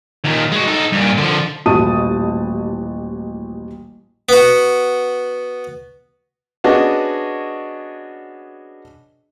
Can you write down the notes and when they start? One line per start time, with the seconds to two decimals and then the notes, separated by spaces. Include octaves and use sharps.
0.25 D#2 A#2
0.52 G#3 F#4
0.68 D#4 A4
0.92 G2 A#2
1.18 D3 F3
1.66 D#1 A1 F#4 A5 D#6 D#7
4.29 B3 F#4
6.64 B3 C#4 D4 F#4 G#4 D#5